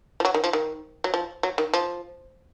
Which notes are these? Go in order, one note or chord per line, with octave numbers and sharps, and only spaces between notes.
F3
F#3
D#3
F3
D#3
F#3
F3
F#3
D#3
F3